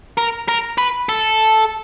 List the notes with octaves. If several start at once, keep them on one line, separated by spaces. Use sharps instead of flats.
A#4
A#4
B4
A4